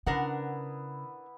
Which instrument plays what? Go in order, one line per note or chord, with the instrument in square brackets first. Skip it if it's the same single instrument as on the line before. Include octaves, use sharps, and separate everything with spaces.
[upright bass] C#3 [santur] B3 E4 B4 [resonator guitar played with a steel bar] D4 A#4 F#5